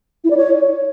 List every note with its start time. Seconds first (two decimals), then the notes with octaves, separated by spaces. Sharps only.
0.24 E4
0.31 D5
0.37 C#5